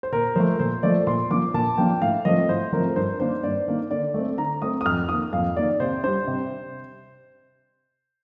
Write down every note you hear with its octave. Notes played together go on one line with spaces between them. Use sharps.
C5
A#2 A#4
F3 A3 C5
A#2 C5
F3 A3 D5
A#2 C6
F3 A#3 D4 D6
A#2 A5
F3 A#3 D4 G5
A2 F5
F3 A3 C4 D#5
A2 C5
F3 A3 C4 A#4
G2 C5
D#3 A#3 D4 C5
G2 D5
D#3 A#3 D4
D3 D5
A3 C4
D3 A#5
A3 C4 D#6
D#6
F2 F6
D#3 A#3 D#6
F2 F5
D#3 A#3 D5
C3 C5
G3 D4 C5
C3